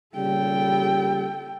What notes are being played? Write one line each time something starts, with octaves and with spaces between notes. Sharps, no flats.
A#2 C#3 G3 A4 G5